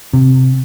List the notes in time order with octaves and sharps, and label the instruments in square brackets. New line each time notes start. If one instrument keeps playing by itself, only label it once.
[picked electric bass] C3